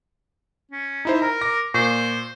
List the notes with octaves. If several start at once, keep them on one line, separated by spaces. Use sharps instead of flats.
C#4
D#4 E4 C5
A#4 A#5
D6 A#6
A#2 C5 C#6